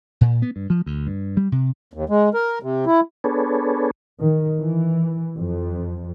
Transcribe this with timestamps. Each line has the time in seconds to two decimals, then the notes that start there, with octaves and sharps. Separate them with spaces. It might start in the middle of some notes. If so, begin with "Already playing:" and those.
0.21 A#2
0.42 B3
0.56 G2
0.70 F3
0.86 D2
1.07 G2
1.37 G3
1.52 C3
1.94 D#2
2.09 G#3
2.34 A#4
2.63 C3
2.86 E4
3.24 B3 D4 G#4 A4 B4 C#5
4.21 D#3
4.59 E3
5.37 F2